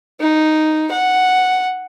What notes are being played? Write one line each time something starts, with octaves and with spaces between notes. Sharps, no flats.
D#4
F#5